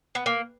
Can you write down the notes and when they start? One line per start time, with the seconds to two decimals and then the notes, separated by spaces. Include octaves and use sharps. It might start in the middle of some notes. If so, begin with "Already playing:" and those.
0.15 B3
0.26 A#3